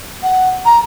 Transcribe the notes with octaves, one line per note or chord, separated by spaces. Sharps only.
F#5
A#5